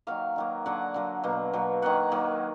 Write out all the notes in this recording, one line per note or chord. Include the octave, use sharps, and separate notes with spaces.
D#3 F#3 A#3 F5
D#3 F#3 A#3
D3 F#3 A#3 F#5
D3 F#3 A#3
B2 F#3 A#3
B2 F#3 A#3
D#3 F#3 A#3 F#5
D#3 F#3 A#3